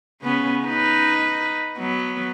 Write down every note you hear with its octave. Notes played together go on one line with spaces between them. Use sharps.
C#3 B3 C#4
D#4 B4
F#3 B3